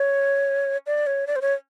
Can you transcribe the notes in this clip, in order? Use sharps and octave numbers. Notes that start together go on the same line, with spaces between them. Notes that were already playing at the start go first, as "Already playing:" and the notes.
Already playing: C#5
D5
C#5
D5
C5
C#5